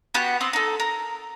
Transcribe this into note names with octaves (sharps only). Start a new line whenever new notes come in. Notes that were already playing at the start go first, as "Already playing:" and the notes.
B3 F#4 G4 F#5
C4 C6 D#6
D#4 A4
A#4